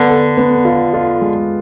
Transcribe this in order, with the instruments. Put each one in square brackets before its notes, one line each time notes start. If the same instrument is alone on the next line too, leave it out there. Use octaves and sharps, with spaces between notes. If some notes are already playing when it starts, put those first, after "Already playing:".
Already playing: [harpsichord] D3 [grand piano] B3
[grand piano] A4
B3
F4
F4
G#3